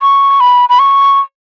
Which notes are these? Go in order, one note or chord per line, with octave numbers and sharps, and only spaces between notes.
C#6
B5
B5
C#6